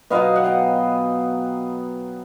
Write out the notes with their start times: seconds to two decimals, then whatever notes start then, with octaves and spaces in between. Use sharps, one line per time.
0.10 B2 F#3 B3 D#5 F5
0.36 F#5
0.44 F5 G5